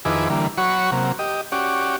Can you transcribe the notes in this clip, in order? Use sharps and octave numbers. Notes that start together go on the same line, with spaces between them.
F2 D#3 E4 G#4 B4 D6
D3 E3 G3 A#3
F#3 F#4 C#5 B5 C#6
C3 F#3 A#3
G4 D#5
C#4 F#4 G4 D5